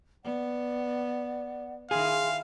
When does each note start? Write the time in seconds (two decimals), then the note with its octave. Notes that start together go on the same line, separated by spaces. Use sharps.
0.24 B3 D5 F#5
1.91 D#3 E4 G#4 F5 G#5 C6